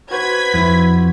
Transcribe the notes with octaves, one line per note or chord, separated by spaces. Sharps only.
F#4 B4 C5 G#6 B6
F2 E4